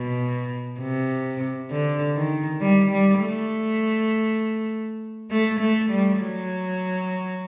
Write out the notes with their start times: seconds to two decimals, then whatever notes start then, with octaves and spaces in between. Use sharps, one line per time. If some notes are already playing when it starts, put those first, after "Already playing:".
Already playing: B2
0.80 C3
1.70 D3
2.15 D#3
2.60 G3
2.90 G3
3.21 A3
5.30 A3
5.60 A3
5.91 G3
6.20 F#3